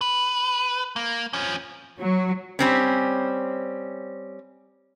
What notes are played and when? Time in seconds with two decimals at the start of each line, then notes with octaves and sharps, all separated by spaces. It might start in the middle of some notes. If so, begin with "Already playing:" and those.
0.01 B4
0.96 A#3
1.33 F3 C#4
1.99 F#3
2.59 G3 C4 C#4